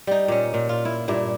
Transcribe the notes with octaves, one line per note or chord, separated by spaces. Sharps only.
G3 D#4
A#2 C#4
A#2
F4
E4
G2 A#2 E4